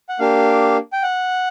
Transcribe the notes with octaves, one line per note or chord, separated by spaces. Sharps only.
F#5
A#3 D4 G4 F5
G5
F#5